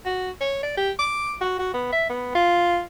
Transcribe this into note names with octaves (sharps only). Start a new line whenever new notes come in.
F#4
C#5
D5
G4
D6
F#4
F#4
B3
E5
B3
F4